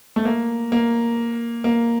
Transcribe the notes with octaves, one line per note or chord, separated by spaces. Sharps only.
A3
A#3
A#3
A#3